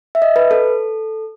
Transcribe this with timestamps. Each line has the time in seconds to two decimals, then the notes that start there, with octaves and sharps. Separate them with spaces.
0.15 E5
0.22 D#5
0.36 B4
0.51 A4